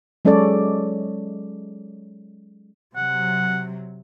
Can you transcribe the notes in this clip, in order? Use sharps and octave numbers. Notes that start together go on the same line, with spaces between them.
F#3 G#3 C#4 A4 C#5 D5
C3 F#3 F#5